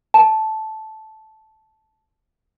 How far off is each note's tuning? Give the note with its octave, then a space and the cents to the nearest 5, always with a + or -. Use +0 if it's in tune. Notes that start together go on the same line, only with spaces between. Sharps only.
A5 -10